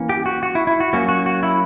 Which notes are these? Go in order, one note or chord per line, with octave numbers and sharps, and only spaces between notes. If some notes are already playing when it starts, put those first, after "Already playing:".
Already playing: E3 A#3 C#4
G4
F#4
F#4
E4
E4
F#4
F#3 A#3 C#4 F#4
F#4
F#4
E4